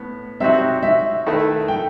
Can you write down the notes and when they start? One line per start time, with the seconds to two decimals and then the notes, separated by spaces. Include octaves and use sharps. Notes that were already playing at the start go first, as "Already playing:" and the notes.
Already playing: A2 B3
0.40 C3 F#3 C4 D#4 F#4 E5
0.83 E5
1.26 D#3 A3 E4 B4 E5
1.68 G5